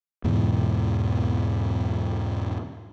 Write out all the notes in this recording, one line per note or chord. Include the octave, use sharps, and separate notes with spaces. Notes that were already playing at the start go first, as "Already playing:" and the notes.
E2 G#2 B2 E3